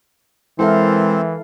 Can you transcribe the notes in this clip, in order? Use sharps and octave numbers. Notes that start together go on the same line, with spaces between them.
E3 G#3 C4 E4 A4 A#4 C5 F5